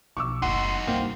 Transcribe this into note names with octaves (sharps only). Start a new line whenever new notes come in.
B1 F3 C#6 D6 E6
F#1 D2 D#4 F#4 F#5 C6
C2 G2 A#3 C4